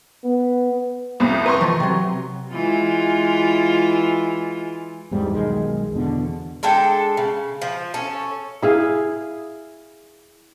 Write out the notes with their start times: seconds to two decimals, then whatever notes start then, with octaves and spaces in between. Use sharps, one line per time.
0.24 B3
1.20 C2 F2
1.46 B4 A#5 C6 C#6
1.61 E3 F3 A3
1.80 C3 F#3
2.50 E3 G#3 F4
5.11 E2 G#2 G3
5.32 B1 D#3 G#3
5.92 E2 B2 D3
6.63 G#3 D4 A4 G5
7.17 C#3
7.62 F3
7.94 C#4 A4
8.62 E4 G#4 F5